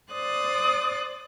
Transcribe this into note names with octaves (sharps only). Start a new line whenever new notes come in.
C5 D5 D#6 F#6 A6